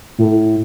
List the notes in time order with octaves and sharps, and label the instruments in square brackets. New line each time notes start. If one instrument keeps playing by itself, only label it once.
[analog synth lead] A2